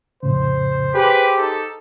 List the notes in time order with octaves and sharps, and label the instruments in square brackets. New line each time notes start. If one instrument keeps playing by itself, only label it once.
[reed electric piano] F2 A2 C#3 [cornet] C5
[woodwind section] G4 [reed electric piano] G#4 [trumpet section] B4
[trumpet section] D#4 A4